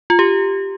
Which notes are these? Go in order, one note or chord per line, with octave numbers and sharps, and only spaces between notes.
F4
G4